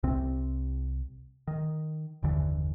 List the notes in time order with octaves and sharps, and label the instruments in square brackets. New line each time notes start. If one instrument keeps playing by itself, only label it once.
[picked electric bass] C2 C3 C4
D#3
F#1 D#2 D3 E3